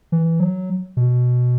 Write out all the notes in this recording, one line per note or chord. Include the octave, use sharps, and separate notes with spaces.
E3
F#3
B2